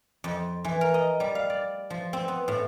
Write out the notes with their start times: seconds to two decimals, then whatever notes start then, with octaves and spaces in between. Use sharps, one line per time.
0.24 F2
0.64 E3
0.81 A#4
0.94 D#5
1.20 G3
1.35 F5
1.50 D5
1.90 F3
2.13 C4
2.28 B3
2.48 A2